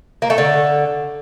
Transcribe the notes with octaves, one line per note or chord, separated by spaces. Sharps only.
A#3
A3
D3